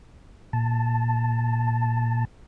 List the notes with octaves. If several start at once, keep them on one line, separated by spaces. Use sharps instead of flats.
A#2 A5